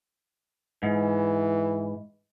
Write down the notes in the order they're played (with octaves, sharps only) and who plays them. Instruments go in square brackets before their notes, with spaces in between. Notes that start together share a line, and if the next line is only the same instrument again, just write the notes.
[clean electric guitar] G#2 [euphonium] E3